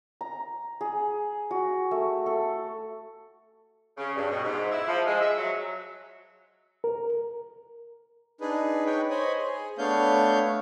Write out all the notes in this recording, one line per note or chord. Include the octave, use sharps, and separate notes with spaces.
A#5
G#4
F#4
A3
A4
C#3
G2
B2
G#2
E4
F3
G#3
E5
F#3
A#4
D4 D#4 G#4 B4
D#4 B4 C#5 G5
C5 C#5 D#5 G#5 B5
G#4
A3 B3 D4 C#5 F5 G6